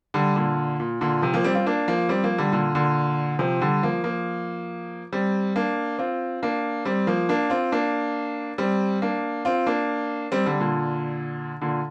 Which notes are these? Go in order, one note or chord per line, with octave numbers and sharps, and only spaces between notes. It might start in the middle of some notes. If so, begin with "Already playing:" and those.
D3 G3
A#2 D3
A#2
A#2 D3
C3 F3
F3 A#3
G3 C4
C4 F4
A#3 D4
F3 A#3
G3 C4
F3 A#3
D3 G3
A#2 D3
A#2 D3
C3 F3
D3 G3
F3 A#3
F3 A#3
G3 C4
A#3 D4
C4 F4
A#3 D4
G3 C4
F3 A#3
A#3 D4
C4 F4
A#3 D4
G3 C4
A#3 D4
C4 F4
A#3 D4
G3 C4
D3 G3
A#2 D3
A#2 D3